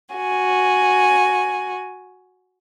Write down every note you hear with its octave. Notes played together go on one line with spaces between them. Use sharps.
F#4 G#5